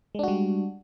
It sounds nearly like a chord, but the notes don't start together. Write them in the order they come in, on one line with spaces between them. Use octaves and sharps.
G#3 D4 F#4 G3